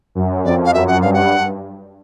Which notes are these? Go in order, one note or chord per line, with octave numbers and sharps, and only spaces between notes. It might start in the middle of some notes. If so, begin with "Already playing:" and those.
F#2
F2 D5
F5
F#2 E5
F#5
G2 F5
F#5